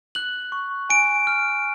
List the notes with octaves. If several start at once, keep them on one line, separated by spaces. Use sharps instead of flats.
F#6 F#7
C#6
G#5 D7
F6